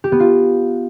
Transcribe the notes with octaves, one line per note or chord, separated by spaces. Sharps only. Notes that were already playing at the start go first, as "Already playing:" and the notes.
G4
B3
F4